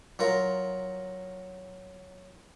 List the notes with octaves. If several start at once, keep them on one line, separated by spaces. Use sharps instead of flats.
F#3 F4 A#4